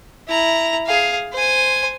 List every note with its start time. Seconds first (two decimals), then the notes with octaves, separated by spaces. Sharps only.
0.28 E4 A#5
0.86 G#4 F5
1.33 C5 G#5